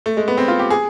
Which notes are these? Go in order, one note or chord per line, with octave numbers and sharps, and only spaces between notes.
A3
G#3
B3
C4
F4
G4
G#4